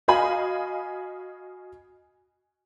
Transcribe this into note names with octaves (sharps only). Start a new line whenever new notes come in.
F#4 D#5 F5 G#5 B5